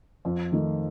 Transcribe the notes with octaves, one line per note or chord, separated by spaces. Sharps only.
F2
D#3 A3